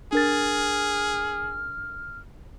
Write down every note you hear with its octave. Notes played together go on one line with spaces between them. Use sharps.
D4 G#4 A#4 F6 A6